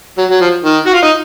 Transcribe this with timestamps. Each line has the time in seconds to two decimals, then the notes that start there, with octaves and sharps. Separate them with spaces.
0.18 F#3
0.31 F#3
0.41 F3
0.64 D#3
0.86 F#4
0.94 F4
1.03 D#4